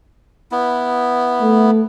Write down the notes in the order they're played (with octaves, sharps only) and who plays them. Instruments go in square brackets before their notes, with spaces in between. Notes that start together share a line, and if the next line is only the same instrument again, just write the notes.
[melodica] B3 E4
[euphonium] A3